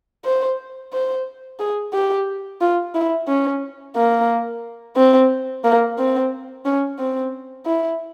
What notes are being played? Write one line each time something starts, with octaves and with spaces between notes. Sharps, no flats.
C5
C5
G#4
G4
F4
E4
C#4
A#3
C4
A#3
C4
C#4
C4
E4